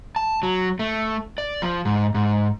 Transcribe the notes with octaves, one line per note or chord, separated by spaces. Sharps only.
A5
F#3
A3
D5
F3
G#2
G#2